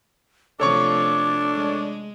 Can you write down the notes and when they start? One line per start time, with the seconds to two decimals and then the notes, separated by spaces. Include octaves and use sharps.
0.60 C3 F3 A3 D4 A4 C#5 C#6 D6
1.55 G#3